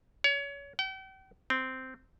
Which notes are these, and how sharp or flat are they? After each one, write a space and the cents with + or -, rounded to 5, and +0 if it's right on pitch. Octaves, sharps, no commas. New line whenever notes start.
C#5 +30
G5 -40
C4 -10